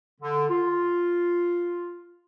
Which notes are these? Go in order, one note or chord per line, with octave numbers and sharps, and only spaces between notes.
D3
F4